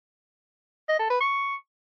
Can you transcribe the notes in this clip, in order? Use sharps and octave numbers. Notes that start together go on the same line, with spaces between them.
D#5
A4
B4
C#6